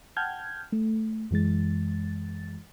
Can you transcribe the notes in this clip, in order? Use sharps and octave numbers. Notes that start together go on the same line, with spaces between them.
F#5 G5 A5 F6 G6 G#6
A3
F#2 E3 G#3 A6